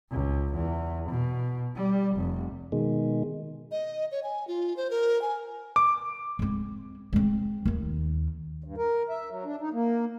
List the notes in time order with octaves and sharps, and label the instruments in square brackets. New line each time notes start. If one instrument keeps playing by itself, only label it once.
[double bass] C#2
E2
B2
G3
F1
[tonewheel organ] B2 D#3 G#3
[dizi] D#5
C#5
G#5
F4
C5
A#4
G#5
[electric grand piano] D6
[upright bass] G#3 C4
G#3 C4
D#2 D#3
[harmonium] G2
A#4
E5
F#3
D4
D#4
A#3